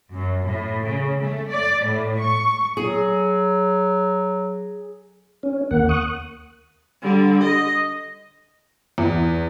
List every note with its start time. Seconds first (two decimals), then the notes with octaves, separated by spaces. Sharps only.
0.13 F#2
0.44 A2
0.84 C#3
1.19 A3
1.49 D5
1.84 A2
2.21 C#6
2.77 F#3 G#4
5.43 C#4
5.71 D#2 A#3 F#5
5.89 C#6 D#6 F#6
7.02 D3 G3
7.42 D#5
8.98 E2